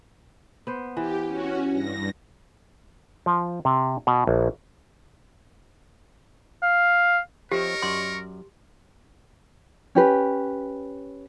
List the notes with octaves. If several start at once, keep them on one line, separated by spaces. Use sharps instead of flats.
B3 C5
E3 G4
C#4 F#4
G2 A#6
F3
C3
B2
A#1
F5
F3 C4 G4 A#4 C#5 D#5 E5 C#6
F#2 D5 C6
C#4 G4 B4